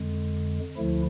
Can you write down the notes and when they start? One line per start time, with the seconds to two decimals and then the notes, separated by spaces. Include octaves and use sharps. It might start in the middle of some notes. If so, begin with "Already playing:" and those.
Already playing: F2 D3 G#3
0.77 D2 D3 F3 A3 E4